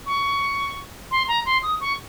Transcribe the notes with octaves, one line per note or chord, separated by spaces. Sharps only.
C#6
C6
A#5
C6
D#6
C#6